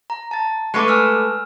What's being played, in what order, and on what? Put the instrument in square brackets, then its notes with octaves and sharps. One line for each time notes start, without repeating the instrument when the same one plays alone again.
[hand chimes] A#5
A5 A6
[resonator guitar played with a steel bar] G#3 A3 B4 [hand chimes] D6 C#7
[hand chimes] G#5 E6 F6